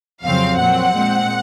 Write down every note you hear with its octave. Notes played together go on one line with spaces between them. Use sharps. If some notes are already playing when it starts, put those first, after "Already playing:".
F2 C#3 F#3 C4 F5
A#2 F#3 C4 F#5
A#2 G#3 C4